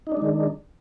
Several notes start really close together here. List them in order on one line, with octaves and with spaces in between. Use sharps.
D#4 D4 G#3 D#3